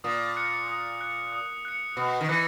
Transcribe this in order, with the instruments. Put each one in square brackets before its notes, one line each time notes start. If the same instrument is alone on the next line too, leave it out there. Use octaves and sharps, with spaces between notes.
[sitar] A#2 [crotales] D#6
[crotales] F#6 C#7
D#6
F#6 C#7
D#6
F#6 C#7
[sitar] B2 [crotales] D#6
[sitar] D#3
[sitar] E3 [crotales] F#6 C#7